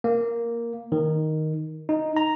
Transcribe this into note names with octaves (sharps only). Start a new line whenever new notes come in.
A#3
D#3
D#4
A#5